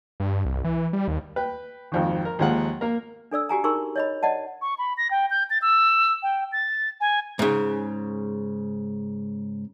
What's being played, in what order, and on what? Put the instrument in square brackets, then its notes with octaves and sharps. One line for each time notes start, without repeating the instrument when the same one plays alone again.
[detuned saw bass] G2
C2
E3
G3
D#2
[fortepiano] B4 G5
G#1 F2 D#3
A#4
D#2 F3 G#3 A#3 F#5
A#3 A#4
[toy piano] D4 A4 D5 E6
F#4 G4 G#5 A#5
D#4 G#4 A#4 C6 C#6 E6
C#5 D#5 B5
D5 D#5 F#5 A5
[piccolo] C#6
B5
A#6
G5
G6
A6
E6
G5
A6
G#5
[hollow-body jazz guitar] G#2 C#3